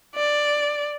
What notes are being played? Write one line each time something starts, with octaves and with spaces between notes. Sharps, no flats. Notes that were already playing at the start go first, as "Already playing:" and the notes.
D5